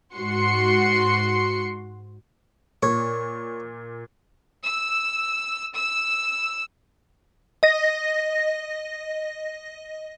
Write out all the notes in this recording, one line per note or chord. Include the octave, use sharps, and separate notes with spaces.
G#2 F#4 C6 C#7
A#2 C#5
E6
E6
D#5 A#6